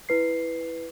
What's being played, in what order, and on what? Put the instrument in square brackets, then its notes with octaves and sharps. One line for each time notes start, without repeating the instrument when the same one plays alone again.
[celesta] E4 B4 C7